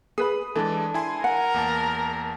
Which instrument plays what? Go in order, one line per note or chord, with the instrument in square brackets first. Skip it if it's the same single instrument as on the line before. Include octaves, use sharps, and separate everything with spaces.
[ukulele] G#4 B4 B5 [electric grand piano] D#6
[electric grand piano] E3 G#3 [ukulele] D4 A4
[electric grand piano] E4 G#5 C6
[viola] A#4 [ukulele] F#5 [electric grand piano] G#5
[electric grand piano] E2 A#3 A5